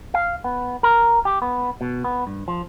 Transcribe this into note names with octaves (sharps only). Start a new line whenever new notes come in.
F5
B3
A#4
G4
B3
B2
B3
G2
F3